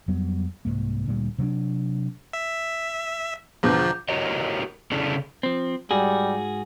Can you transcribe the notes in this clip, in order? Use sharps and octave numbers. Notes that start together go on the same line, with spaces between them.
F2 F#3 G3 B3
C2 F2 G#2 A#3
D2 A#2 G3
C3 F#3 C4 D4
E5
E2 B2 D3 F3 A#5 D6 G6
E4 F#4 G4 A#4 C#5 D#5
C#3 C#4 D4 E4 G#4 A4
F3 C4
G#2 G3 F#4 G#4